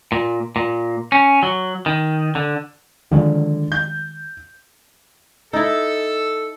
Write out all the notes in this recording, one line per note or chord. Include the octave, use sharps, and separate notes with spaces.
A#2
A#2
C#4
F#3
D#3
D3
D3 D#3 F3 G#3
G6
D#4 E4 A4